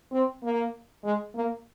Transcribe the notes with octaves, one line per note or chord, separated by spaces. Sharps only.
C4
A#3
G#3
A#3